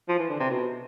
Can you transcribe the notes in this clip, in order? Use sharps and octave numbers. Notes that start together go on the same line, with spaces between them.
F3
E3
D3
C3
B2